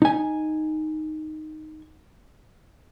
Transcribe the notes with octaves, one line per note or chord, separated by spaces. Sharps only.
D#4 G#5